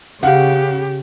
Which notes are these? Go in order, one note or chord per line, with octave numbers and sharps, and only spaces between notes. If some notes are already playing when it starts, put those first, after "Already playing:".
C#3 G4 F5 F#5